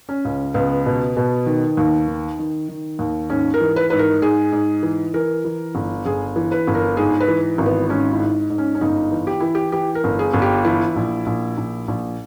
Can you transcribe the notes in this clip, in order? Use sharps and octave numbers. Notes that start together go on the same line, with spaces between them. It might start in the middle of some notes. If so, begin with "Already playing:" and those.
C#4
C#2
C#2 B3
B2
B2
D#3
D#2
D#3
D#3
D#3
D#2
G#2 C#4
A#4
E3
B4
G#2 B4
A#4
G#2 G#4
G#2
E3
E3 A#4
E3
G1
G1 G#4
E3
B4
G1
A#4
G#2 G#4
B4
E3
G#1
B3
G#2 C#4
E4
G#2
G#2
C#4
C#4
G1 D#4
E3
G4
E3 E4
G4
E3 G4
A#4
G1
G#4
G1
G4
E3 E4
A#1
A#1
A#1
A#1